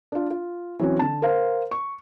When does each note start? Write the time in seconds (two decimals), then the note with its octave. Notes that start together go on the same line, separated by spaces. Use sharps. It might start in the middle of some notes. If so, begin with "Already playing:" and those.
0.12 D4 F4
0.30 F4
0.79 E3 F#3 C4 C#4 F#4
0.99 D3 A5
1.22 A#4 C5 F5
1.71 C#6